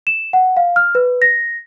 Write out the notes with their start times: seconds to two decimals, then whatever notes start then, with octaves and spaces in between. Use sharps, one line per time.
0.07 E7
0.33 F#5
0.57 F5
0.76 F6
0.95 B4
1.22 A#6